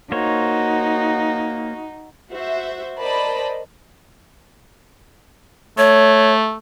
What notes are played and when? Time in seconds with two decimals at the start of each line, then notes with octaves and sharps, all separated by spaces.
0.12 A#3 D#4 F#4 C5 C#5
2.31 F#4 C5 E5
2.99 A#4 C5 D5 D#5 A5 B5
5.78 A3 C#5